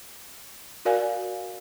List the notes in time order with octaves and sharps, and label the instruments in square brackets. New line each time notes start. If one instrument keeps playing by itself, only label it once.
[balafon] F#4 A#4 D5 F5 G#5